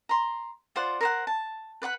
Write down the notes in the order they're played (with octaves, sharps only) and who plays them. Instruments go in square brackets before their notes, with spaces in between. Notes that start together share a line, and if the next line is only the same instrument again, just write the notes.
[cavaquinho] A#5 C6
F4 C5 D5 F#5
A#4 C5 F#5
A5
B4 D5 F#5 B5